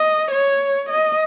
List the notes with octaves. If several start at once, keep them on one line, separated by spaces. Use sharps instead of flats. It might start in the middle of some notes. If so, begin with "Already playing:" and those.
Already playing: D#5
C#5
D#5